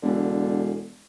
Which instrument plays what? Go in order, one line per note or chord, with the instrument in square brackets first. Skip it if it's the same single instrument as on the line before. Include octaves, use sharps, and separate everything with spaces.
[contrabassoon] E1 [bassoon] D3